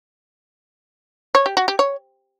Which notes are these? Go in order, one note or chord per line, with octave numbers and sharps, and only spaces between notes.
C#5
G4
F#4
G4
C#5